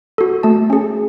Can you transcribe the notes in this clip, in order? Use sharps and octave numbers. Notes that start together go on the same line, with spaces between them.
F#4 A4
A3 A5
C#4 G#4